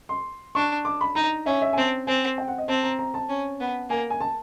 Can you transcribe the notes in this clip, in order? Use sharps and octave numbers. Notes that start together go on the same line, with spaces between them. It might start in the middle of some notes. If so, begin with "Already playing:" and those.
C6
D4 C#6
D6
B5
D#4 A#5
C#4 E5
E5
G#5
C4 A5
C4 G#5
G5
F#5
D#5
C4 A5
A#5
A#5
A5
C#4
B3
A#3 G#5
G#5
A5